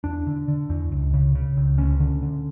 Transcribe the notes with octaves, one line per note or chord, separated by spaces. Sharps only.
E2 D4
D3
D3
E2
C#2
C#3
C#3
C#2
D2 C#4
D3
D3